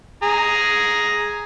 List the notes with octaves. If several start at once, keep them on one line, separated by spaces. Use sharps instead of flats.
G#4 A#5